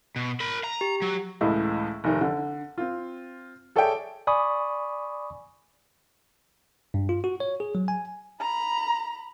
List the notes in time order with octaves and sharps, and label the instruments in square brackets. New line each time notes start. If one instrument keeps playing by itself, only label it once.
[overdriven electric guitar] B2
A#4 B5
A#5
[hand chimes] G4
[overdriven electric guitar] F#3
[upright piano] C#2 A2 E3 E4 D#5
F1 D#3 D#4
D3
C4 F4
G#4 A4 C#5 D5 E5 G5
[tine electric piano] D5 G#5 B5 C#6 D#6
G2
F4
F#4
C#5
G#4
F#3
G#5
[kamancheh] A#5 B5